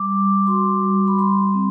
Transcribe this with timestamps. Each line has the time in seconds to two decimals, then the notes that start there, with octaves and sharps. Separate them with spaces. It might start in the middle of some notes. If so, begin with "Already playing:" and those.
Already playing: G3 D6
0.12 G3
0.47 F#4 C6
0.83 G3
1.07 B5
1.18 G3 C6
1.54 C4